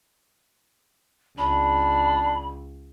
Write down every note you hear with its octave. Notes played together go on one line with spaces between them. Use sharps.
C#2 D4 B5